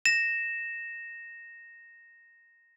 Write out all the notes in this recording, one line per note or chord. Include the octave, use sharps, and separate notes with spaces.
A#6 E7